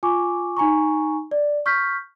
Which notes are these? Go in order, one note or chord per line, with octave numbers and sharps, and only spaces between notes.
F4 G#5 C#6 D6
D#4 G#5 A#5 C#6
D5
C#6 F6 G6 B6